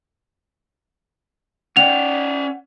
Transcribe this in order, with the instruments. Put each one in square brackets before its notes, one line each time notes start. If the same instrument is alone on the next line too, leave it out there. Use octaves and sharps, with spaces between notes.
[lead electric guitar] C#4 D5 [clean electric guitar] F#5 G5 [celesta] F7